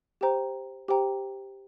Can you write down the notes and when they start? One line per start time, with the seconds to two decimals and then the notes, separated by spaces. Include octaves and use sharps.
0.21 G4 C5 G5 A#5
0.88 G4 C5 G5 A#5